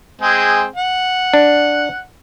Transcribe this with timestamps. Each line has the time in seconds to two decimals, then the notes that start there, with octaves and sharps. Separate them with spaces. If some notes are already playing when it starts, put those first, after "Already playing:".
0.21 G#3 C4 G#4
0.76 F#5
1.34 D4